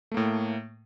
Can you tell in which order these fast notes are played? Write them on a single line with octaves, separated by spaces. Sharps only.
A3 A#3 A2